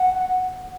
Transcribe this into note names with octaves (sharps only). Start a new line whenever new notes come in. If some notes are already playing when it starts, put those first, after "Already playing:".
Already playing: F#5